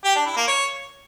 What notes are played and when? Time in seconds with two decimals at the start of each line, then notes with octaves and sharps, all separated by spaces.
0.05 G4
0.15 D4
0.26 E4
0.37 A#3
0.47 C#5